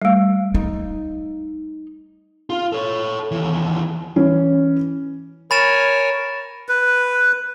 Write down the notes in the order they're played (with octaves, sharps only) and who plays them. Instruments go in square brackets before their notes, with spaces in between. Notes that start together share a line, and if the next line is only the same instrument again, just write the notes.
[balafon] G3 A3
[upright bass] D#4
[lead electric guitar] F4
A4 C#5
D#2 E3
[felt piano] E3 C#4
[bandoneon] A#4 C#5 G#5 [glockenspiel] B5 A6 E7
[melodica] B4